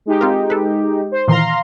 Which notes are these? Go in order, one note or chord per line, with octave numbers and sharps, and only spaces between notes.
G#3 D#4 G4
C4 F4 A#4
A4 B4
C5
A#2 D#3 E3 F5 A#5 C6